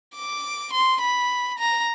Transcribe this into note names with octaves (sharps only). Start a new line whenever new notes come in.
D6
C6
B5
A#5